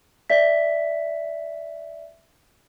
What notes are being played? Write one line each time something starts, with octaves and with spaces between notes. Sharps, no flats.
D5 E5 B6